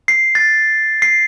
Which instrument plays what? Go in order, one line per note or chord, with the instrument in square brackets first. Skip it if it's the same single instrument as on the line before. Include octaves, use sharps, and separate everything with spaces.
[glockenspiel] C7
A6
C7